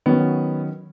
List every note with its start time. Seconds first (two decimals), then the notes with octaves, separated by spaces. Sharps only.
0.06 D#3 F#3 B3 C#4